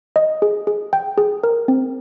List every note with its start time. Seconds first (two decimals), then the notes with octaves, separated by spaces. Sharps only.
0.16 D#5
0.42 G#4
0.67 G#4
0.93 G5
1.18 G#4
1.44 A#4
1.68 C4